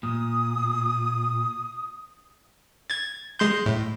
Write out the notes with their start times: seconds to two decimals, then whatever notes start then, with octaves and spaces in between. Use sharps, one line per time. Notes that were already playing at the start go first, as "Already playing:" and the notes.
0.03 A#2 D#6
2.90 G#6 A6
3.39 G#3 C6 G6
3.66 A2